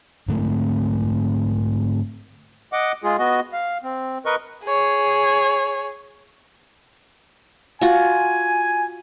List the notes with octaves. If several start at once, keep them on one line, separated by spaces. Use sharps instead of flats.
G#2 D3 A3 C4
D#5 F#5 D6
G#3 F4 G#4
B3 F#4 D#5
F5
C4
A#4 B4 D#5 C#6
G#4 C#5
F4 F#4 G#5